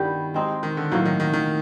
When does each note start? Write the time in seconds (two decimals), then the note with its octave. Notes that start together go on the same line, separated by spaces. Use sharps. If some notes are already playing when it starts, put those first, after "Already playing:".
Already playing: G2 D#3 G3 B3 E4 G4
0.34 G#3 C4 D#4
0.63 D#3
0.77 D3
0.92 A2 D#3 F#3 A#3
1.05 D#3
1.20 D#3
1.33 D#3